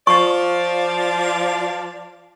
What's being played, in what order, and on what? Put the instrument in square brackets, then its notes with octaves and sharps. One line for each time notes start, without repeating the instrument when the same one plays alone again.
[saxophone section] F3 D5 [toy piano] C#6